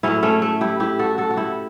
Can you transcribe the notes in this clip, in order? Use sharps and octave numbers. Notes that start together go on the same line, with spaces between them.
A2 F#3 C#4 E4
A3 C#4
A3
E4 G4
E4 G4
F#4 A4
F#4 A4
F#4
E4 G4